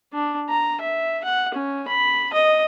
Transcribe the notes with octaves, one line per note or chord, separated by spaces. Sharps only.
D4
A#5
E5
F#5
C#4
B5
D#5